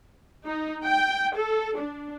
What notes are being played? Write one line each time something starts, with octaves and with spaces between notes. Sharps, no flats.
D#4
G5
A4
D4